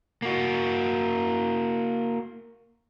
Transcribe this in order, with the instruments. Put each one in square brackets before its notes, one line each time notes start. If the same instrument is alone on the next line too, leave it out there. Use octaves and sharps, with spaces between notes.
[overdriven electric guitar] A#3 F#4